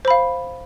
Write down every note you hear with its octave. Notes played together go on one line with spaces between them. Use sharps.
C5 F5 B5